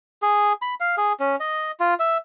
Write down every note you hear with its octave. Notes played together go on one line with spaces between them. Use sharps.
G#4
B5
F5
G#4
C#4
D#5
F4
E5